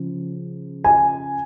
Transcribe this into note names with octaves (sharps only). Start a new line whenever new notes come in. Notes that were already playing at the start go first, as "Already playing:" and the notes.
Already playing: C#3 F3
G#5